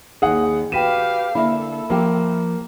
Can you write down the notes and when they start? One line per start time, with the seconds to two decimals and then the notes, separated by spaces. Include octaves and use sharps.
0.22 D#2 D#4 G#4 F#5
0.72 F#4 G4 B4 F5 G5 B6 D#7 E7
1.35 D3 A#3 E4 A4 E5 B5
1.90 F3 A#3 G4